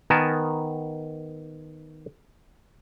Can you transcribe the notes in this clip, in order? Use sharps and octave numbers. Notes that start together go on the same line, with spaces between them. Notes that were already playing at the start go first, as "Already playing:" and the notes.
D#3 B3 A#4 G#5 A5